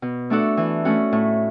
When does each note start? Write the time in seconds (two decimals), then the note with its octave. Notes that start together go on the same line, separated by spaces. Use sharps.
0.02 B2
0.30 A3 D4 F#4 A4
0.57 E3
0.85 A3 C#4 F#4
1.12 A2